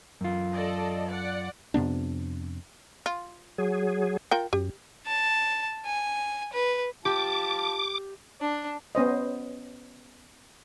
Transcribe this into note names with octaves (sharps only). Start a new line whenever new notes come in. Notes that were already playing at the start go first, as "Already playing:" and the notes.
F#2 F4
A4 D5 D#5
D5 F#5
F2 C3 B3 D4
F4
F#3 G#4
F4 A#4 G5
F#2 G4
A5
G#5
B4
F4 G4 A5 D6
D4
B3 C#4 C5 D#5